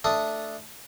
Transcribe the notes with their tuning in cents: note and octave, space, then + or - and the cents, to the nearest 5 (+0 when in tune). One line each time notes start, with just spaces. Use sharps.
A3 +0 D4 +0 D#6 +0